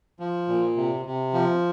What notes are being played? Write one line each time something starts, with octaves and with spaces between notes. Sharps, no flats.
F3
A#2
C3
C3
F3